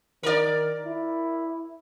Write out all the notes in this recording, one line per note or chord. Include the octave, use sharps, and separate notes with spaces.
D#3 A#4 D5
E4